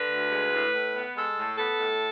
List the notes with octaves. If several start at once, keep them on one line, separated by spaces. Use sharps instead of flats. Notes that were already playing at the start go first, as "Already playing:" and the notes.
Already playing: D3 B4
D2
G#3
A2
A2
B3
G#3 A4
A2
B3 A4
A2